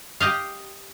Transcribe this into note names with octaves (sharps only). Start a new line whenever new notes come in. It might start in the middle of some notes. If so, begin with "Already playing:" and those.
G4 D#5 F5